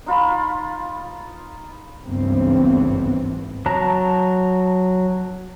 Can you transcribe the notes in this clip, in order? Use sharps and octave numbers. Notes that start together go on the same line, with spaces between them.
D#4 F4 B5
G#1 C#2 G2 E3 B3 C4
F#3 A5 A#5